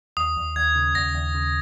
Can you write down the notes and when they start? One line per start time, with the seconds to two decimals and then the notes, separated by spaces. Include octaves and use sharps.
0.17 D#2 D#6
0.37 D#2
0.56 D#2 G#6
0.76 C#3
0.95 D#2 A#6
1.15 D#2
1.35 C#3